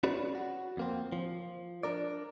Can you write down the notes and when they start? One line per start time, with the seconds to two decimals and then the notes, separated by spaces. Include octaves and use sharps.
0.03 C#4 F#4 G#4 B4 C#5 D5
0.35 F#4
0.77 F2 A#3 C4
1.12 F3
1.83 D4 A#4 D5